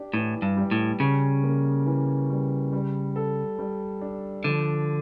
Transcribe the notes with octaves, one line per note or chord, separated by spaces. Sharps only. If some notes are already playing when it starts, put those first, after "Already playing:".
Already playing: D4 G4
A2 E3
G2
G3
A2
C#3 C#4
A#3
E3
G3
G3
A4
G3
D4
D3 F3